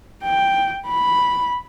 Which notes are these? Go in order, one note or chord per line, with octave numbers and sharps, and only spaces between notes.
G5
B5